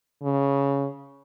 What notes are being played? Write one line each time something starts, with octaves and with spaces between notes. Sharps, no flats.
C#3